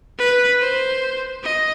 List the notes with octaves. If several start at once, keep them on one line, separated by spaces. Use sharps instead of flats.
B4
C5
D#5